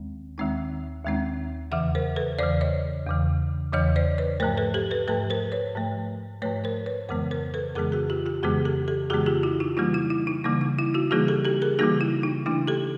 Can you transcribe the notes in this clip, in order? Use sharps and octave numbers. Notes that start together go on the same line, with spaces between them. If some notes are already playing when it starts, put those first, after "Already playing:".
Already playing: D#2 D#3 G#3 C4
D#2 D#3 G#3 C4 D#4
D#2 D#3 G#3 C4 D#4
E2 C#3 E3 E5 F#5
A#4 C5
A4 B4
E2 C#3 E3 C5 D5
C#5 D#5
E2 C#3 E3
E2 C#3 E3 C#5 D#5
C5 D5
B4 C#5
G#2 F3 A3 A#4 C5
A4 B4
G4 A4
A4 B4
G#2 F3 A3 A4 B4
A#4 C5
B4 C#5
G#2 F3 A3
G#2 F3 A3 B4 C#5
A#4 C5
B4 C#5
F2 C#3 E3 G#3 B3 A#4 C5
A#4 C5
A4 B4
F2 C#3 E3 G#3 B3 G#4 A#4
F#4 G#4
F4 G4
F4 G4
F2 C#3 E3 G#3 B3 F#4 G#4
G4 A4
G4 A4
F2 C#3 E3 G#3 B3 F#4 G#4
F4 G4
E4 F#4
D#4 F4
C#3 E3 G3 A#3 D#4 F4
E4
E4
D#4
C#3 E3 G3 A#3 D#4
D#4
E4
E4 F#4
C#3 E3 G3 A#3 D#4 F#4 G#4
G4 A4
G4 A4
G#4 A#4
C#3 E3 G3 A#3 D#4 F#4 G#4
E4
D#4
C#3 E3 A3 D4 E4
G4 A4